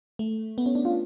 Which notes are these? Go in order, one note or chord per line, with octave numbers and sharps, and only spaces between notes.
A3
B3
C#4
D4
F4